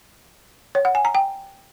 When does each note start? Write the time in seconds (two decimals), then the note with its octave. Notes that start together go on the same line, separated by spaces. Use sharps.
0.75 C#5
0.85 F#5
0.95 G#5
1.05 A#5
1.15 G5